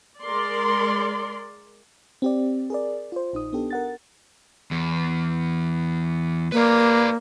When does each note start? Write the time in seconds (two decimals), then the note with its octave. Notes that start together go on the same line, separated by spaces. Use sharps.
0.24 G#3 A#4 D5 C6
2.22 C4 G4 D5
2.70 G#4 A#4 D5
3.12 F4 C5
3.33 A#1 D#4 D#6
3.53 B3 D4 G4 A4
3.71 A#4 F#5 A6
4.71 E2
6.52 A#3 B4 D5